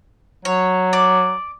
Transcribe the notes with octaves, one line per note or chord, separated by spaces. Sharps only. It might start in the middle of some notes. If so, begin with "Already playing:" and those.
F#3 C#5
D5